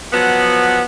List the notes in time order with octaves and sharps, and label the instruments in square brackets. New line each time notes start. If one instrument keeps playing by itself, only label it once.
[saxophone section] F3 F#3 B3